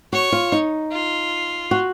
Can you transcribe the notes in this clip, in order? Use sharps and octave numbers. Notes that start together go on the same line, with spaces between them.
F#4 C#5
F4
D#4
F4
F#4